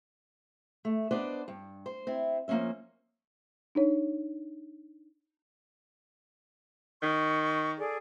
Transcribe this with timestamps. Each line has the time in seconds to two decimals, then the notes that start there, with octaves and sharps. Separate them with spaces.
0.85 A3
1.11 B3 D4 C5 D5 D#5
1.48 G2
1.86 C5
2.07 C4 E4
2.48 F3 A#3 C4 C#4 E5
3.75 D4 D#4 C#5
7.03 D#3 C#6
7.77 G#4 A4 D5